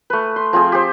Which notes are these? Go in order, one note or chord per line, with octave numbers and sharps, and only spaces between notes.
A3 B4
C6
F3 C4 F4 G#4
G4 C5